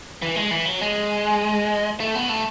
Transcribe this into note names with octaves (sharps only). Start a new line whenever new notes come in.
E3
G#3
E3
F#3
G#3
A3
B3
A3